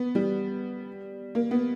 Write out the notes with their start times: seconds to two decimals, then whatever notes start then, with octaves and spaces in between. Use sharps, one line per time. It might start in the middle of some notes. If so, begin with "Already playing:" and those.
Already playing: B3
0.15 G3
1.35 A#3
1.51 B3